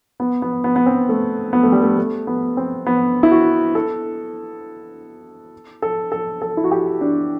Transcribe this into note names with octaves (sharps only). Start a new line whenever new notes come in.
B3
B3
B3
B3
C4
A3
B3
A3
G3
A3
A3
B3
C4
B3
E4
F#4
A4
A4
A4
A4
E4
F#4
G4
D4